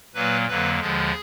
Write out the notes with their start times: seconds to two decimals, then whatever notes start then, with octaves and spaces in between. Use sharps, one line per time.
0.15 A#2 F#3 A#3 B4
0.47 F2 D3 F#3 A#3 B4
0.80 D#2 D3 F3 G#3 G#4